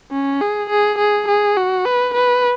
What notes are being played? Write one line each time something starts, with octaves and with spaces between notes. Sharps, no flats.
C#4
G#4
G#4
G#4
G#4
F#4
B4
B4